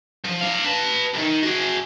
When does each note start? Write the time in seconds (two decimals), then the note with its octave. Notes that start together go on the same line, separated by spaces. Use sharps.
0.24 F3
0.41 D4 F5
0.64 B4 A5
1.14 C2 D#3
1.43 F#4 G#4